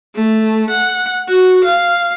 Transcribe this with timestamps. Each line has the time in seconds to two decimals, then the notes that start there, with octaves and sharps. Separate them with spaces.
0.15 A3
0.70 F#5
1.29 F#4
1.64 F5